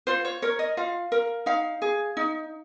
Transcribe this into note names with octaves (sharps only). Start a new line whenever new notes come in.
F4 C5
C#5
A#4 C#5
D#5
F4 F5
A#4
D#4 F5
G#4
D#4